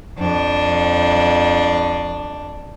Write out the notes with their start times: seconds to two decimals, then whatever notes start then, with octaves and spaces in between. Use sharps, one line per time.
0.17 F2 D4